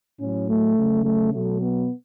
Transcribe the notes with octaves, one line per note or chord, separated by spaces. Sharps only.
A2 F#3 C#4
A3
C#3 F#3
A3
B2 F#3 A3
B3